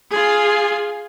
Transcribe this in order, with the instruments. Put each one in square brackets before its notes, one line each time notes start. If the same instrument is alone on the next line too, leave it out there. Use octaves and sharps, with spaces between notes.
[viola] F4 G#4